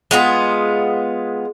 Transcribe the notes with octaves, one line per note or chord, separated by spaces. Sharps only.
G#3 B3 F4